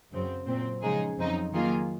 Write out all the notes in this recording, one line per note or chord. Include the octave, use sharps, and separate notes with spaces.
F#2 C#3 F#3 C4
A#2 F#3 C4
C#3 F3 G#3 D#4 G#4
F2 C#3 F#3 C4 D#4
D#3 F#3 A#3 F4 G#4